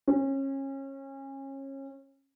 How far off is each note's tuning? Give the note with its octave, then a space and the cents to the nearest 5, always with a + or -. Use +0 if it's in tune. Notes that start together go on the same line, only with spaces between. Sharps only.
C#4 -30